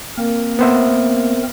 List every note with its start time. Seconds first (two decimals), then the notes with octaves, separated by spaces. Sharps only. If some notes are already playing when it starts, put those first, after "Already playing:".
0.17 A#3 C4 A#4
0.59 B3 C5 E5